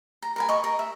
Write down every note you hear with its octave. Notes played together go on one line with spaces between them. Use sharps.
A#5
A#4 B4 G#5
D#5 C#6
A#4
E5